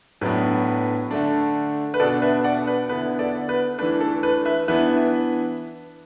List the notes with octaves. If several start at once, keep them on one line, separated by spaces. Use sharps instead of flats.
A2 F#3 B3 D4 B4
D3 A3 D4
B4
B2 B3 D4 A4 D5
B4 E5
D5 F#5
B4
D3 B3 E4 B4
A4 D5
B4
E3 A3 D4 B4
A4
B4
B4 E5
E3 B3 D4 B4 E5